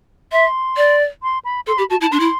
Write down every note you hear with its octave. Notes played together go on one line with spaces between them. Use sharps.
E5 C6
D5
C6
B5
A4 C6
G4 B5
F#4 A5
E4 A5
D4 C6
E4